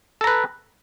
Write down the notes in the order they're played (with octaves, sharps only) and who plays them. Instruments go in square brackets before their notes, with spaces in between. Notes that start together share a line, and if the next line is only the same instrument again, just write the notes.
[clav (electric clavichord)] A4
A#5
B4